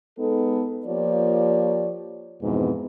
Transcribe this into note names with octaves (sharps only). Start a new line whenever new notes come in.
G#3 B3 D#4 A4
F3 A#3 F4 G4 C#5 D5
F2 G#2 B2 E3 G#3 B3